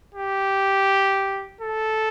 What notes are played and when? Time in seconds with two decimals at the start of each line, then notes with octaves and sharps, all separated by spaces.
0.14 G4
1.61 A4